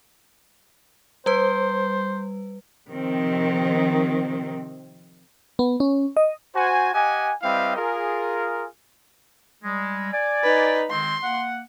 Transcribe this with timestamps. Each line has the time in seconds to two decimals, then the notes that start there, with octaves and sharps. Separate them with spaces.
1.26 G3 B4 C5
2.89 C3 D#3 F3 C4
5.59 B3
5.80 C#4
6.17 D#5
6.55 F#4 C5 G#5
6.94 G4 D#5 F#5 G#5
7.42 G3 C4 E4 B4 D#5 F5
7.77 F4 G#4 A#4
9.63 G3 G#3
10.12 D5 G#5
10.43 D#4 B4
10.90 D#3 G#3 C4 C6
11.23 A#3 F#5